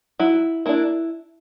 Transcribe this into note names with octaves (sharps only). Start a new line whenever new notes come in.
F#3 E4
A#3 D4 E4